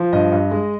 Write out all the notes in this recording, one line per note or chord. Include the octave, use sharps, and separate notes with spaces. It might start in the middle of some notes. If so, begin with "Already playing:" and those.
Already playing: F3
G2 D#5
G2
G#3